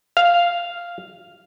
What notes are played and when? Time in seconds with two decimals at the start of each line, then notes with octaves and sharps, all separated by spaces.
0.17 F5